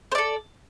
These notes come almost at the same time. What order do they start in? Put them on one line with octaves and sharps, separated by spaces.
C5 D5 A4